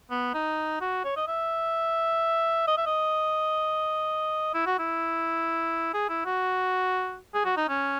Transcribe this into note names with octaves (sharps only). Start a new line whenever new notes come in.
B3
D#4
F#4
C#5
D#5
E5
D#5
E5
D#5
E4
F#4
E4
G#4
E4
F#4
G#4
F#4
D#4
C#4